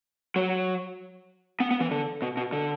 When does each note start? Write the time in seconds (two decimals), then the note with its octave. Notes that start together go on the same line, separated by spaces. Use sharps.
0.36 F#3
1.60 B3
1.71 B3
1.81 E3
1.91 D3
2.22 B2
2.37 B2
2.53 D3